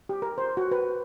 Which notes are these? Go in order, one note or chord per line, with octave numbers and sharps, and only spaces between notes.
G4
A#4
C5
F#4
B4